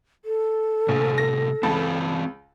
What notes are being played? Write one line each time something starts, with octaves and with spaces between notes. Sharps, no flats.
A4
A#1 A2 C3
A#6
C#2 E3 C4 A5 B5